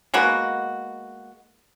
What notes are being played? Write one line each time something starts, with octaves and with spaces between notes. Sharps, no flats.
G#3 A#3 B3 F#4